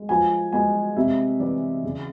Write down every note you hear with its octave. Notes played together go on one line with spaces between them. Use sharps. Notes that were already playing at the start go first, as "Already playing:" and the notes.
Already playing: G#3
F3 G#5
G#3 G#5
C3 E5
E3 D5
C#3